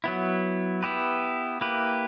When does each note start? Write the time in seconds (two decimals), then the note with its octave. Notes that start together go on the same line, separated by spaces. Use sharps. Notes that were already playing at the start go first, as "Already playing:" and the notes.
0.04 F#3 B3 E4
0.83 B3 E4 G4 B4
1.61 A#3 E4 G4 B4